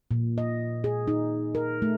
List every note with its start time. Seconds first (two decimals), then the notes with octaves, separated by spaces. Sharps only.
0.11 A#2
0.38 D#5
0.84 G#4
1.08 D#4
1.55 A#4
1.82 A3